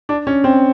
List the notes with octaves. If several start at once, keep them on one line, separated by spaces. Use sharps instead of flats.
D4
C#4
C4